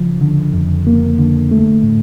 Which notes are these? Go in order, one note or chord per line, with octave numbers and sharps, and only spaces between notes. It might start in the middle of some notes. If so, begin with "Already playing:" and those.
Already playing: C#3 F3
D3
F2
A#3
D3
A3
A2